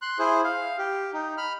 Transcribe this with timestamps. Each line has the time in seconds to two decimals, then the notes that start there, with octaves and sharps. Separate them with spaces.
0.02 C6 F#6
0.19 E4 G#4 C5
0.44 F5
0.79 G4
1.13 D#4
1.37 B5 F6